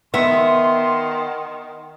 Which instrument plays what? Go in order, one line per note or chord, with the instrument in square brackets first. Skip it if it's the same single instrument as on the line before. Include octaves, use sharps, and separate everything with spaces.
[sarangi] D#3 [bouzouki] B3 [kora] E5 [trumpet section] C6